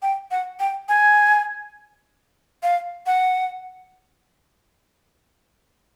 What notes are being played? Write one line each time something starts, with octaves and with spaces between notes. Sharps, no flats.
G5
F#5
G5
G#5
F5
F#5